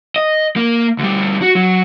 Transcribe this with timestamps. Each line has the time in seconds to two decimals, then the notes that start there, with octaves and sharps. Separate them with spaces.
0.16 D#5
0.56 A#3
0.99 D2 G3
1.42 F#4
1.55 F#3